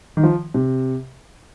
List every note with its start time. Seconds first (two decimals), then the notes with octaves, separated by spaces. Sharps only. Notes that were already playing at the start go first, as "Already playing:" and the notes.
0.17 D#3
0.23 F3
0.54 C3